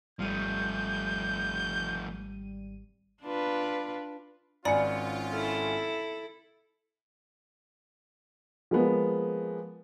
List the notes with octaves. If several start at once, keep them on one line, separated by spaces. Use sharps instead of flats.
G#1 F3 G3 A3 G6 D#7
D4 F4 B4
G#1 C#4 F4 D5 G#5 B5 C#7
E4 A4
F3 G#3 A#3 B3